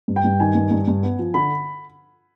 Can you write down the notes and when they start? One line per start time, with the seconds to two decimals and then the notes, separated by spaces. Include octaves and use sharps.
0.08 G2
0.16 G5
0.24 G2
0.40 D#3 G#5
0.55 G2
0.71 G2
0.88 G2
1.03 B3
1.19 F3
1.34 D3 B5